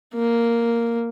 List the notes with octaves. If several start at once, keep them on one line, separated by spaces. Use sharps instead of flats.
A#3